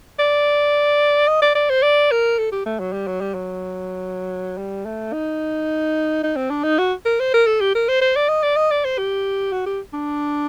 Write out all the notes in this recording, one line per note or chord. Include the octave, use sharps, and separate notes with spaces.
D5
D#5
D5
D5
C5
D5
A#4
A4
G4
A3
F#3
G3
F#3
G3
F#3
G3
A3
D#4
D#4
C4
D4
D#4
F#4
A#4
C5
A#4
A4
G4
A#4
C5
C5
D5
D#5
D5
D#5
D5
C5
G4
F#4
G4
D4